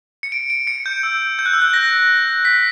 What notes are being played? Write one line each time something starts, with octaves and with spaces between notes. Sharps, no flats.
C#7
D7
D7
C#7
G6
E6
G6
F#6
E6
F#6
A#6
B6